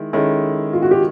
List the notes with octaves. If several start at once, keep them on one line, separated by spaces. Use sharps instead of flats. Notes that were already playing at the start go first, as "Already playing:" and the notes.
Already playing: D#3 G#3 E4
D#3 G#3 C#4 E4 A4
F4
F#4
G4